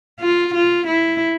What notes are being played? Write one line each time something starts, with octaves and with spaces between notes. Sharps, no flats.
F4
F4
E4